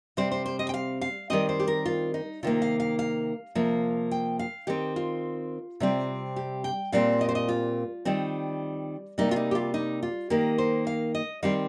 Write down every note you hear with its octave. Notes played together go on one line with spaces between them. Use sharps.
C3 G3 C4 C5
C5
C5
D#5
G5
F5
F5
D#3 G3 C4 D#5
C5
G4
A#4
F4
D#4
C3 D#3 A#3 F4
F5
F5
F5
C3 F3 A#3
G5
F5
D#3 C4 G4
F4
C3 G3 C4
G4
G5
A#2 G3 C4 F5
D#5
C5
D#5
F4
D#3 G3 C4
C3 G3 A#3 D#4
F4
D#4
G4
F4
D#4
F4
D#3 A#3 G4
C5
F5
D#5
D#3 G3 C4 F5